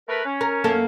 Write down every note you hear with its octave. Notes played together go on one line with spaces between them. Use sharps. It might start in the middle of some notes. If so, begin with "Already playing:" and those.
A3 A#4 B4
C#4
A#4
F#2 A#3 A4